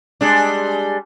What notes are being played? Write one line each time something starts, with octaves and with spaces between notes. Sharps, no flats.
G3 G#3 D4